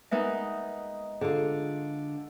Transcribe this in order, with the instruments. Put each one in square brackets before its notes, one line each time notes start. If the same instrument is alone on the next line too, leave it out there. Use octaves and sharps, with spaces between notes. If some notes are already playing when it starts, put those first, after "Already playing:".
[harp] G#3 B3 D#4 [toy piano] A#4 B4 E5
[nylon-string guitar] D3 F4 [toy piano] G#4